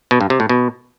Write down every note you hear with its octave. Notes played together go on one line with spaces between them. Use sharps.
B2
G2
C3
A2
B2